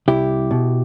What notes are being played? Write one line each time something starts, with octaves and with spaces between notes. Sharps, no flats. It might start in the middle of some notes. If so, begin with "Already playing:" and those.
C2 E4 G4
B2